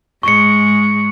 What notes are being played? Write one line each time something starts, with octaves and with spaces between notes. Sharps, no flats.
G#2 G#3 C#6 C#7